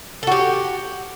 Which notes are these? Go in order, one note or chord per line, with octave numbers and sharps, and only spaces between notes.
F#4 G4 A4